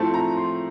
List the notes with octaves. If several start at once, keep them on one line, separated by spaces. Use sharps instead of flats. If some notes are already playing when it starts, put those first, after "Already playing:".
Already playing: A2 F3 A3 C4 A5
A#5
C6